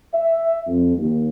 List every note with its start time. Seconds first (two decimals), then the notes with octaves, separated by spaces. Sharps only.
0.15 E5
0.67 F2
0.98 D#2